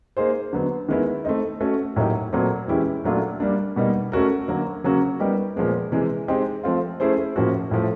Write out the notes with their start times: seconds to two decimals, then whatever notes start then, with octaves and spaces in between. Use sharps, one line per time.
0.17 A#3 D#4 G#4 C5
0.53 D3 F#3 B3
0.89 D#3 G#3 B3 E4
1.25 A3 C4 D#4
1.61 A3 C#4 F#4
1.96 A2 F#3 A#3 D#4 G4
2.33 A#2 F#3 A3 C4
2.68 E3 G#3 C#4 E4 G4
3.04 A#2 F#3 A3 D4 F4
3.40 G3 A#3 D4
3.76 B2 G3 A#3 D#4
4.12 A3 C#4 F#4 A#4
4.48 D3 F#3 A#3
4.84 C#3 F#3 A#3 C#4 F#4
5.19 G3 B3 D#4 G4 A#4
5.56 A#2 F3 G#3 B3
5.92 C3 E3 G#3
6.28 G#3 C4 D#4 G4
6.64 F3 A3 C4 F4
7.00 A3 C#4 E4 G#4 C5
7.36 A2 F3 A#3 C#4 F#4
7.71 A2 F3 A3